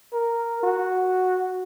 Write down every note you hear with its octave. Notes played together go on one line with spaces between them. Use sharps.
A#4
F#4